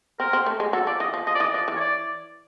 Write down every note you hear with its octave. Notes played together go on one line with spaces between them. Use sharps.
C4 A#4
C4
A3
G#3
F#3 A4
F3 D5
E3 D#5
F3
F3 D#5
D5
E3 D#5
F3 D5
E3
C#5
D5